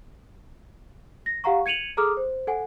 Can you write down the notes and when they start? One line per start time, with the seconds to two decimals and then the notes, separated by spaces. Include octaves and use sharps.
1.26 A#6
1.44 G4 F5 F#5 A#5 C#6
1.66 G#6 C#7 D#7 F7 F#7
1.97 G#4 A4 A#5 D6 D#6 F6
2.17 C5
2.47 A4 F#5 G#5